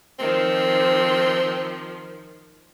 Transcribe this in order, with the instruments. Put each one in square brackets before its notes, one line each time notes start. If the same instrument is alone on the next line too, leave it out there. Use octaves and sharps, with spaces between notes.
[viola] D#3 F3 [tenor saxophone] C4